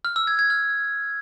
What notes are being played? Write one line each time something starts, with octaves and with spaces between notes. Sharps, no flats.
F6
E6
G#6
G#6
F6